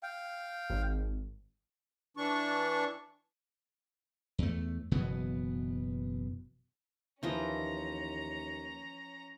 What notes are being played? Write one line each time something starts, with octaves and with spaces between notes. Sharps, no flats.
F5 G5
G#1
E3 D4 C#6
E2 A3
F#1 B2 E3 B3
D#2 E3 F3 C#4 D#5 A#5